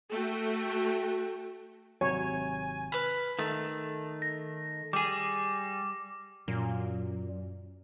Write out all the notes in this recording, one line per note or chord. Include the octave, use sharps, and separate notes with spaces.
A3 F#4 G5
G#1 C3 F#3 C#5 G#5
B4 B5 F6
D#3 A3
A#6
G3 G#4 D6
F#2 A#2